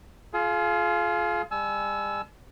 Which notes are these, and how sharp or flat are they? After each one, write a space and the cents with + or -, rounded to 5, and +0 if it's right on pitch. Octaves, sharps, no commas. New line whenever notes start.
F4 -5 G#4 +40
G3 +40 G#5 +45 E6 +0